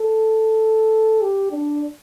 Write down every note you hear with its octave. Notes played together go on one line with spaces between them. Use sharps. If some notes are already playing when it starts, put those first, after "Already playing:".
Already playing: A4
G4
D4